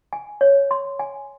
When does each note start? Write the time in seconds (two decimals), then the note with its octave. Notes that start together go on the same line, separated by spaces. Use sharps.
0.13 G#5
0.41 C#5
0.71 C6
0.99 G#5